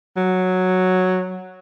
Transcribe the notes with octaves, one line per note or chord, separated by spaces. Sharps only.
F#3